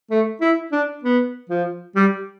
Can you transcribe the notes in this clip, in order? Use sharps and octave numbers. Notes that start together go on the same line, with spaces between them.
A3
E4
D4
B3
F3
G3